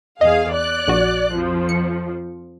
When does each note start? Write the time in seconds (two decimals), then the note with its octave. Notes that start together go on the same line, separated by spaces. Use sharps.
0.21 E2 G#4 D#5 F5
0.53 D5 F#6
0.88 A#1 F#4
1.32 F2 F3
1.69 C#7